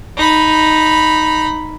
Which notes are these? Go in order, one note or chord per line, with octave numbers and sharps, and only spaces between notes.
D#4 B5